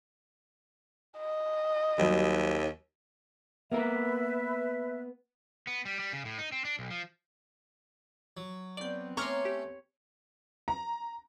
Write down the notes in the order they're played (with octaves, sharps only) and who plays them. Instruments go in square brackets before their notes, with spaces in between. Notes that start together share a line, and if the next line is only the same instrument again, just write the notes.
[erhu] D#5
[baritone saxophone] D#2 [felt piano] F#3 G3
[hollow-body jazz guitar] A#3 B3 A#4 [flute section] B4 E5
[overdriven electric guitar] B3
G3
G3
C#3
A2
D#4
C4
D4
B1
F3
[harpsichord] F#3
[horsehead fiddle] B3 C4 [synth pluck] D5 G6
[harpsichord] A3 C#4 [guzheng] C#5 C6 [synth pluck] A#5 D6 F6
[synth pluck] G4
[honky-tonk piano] A#5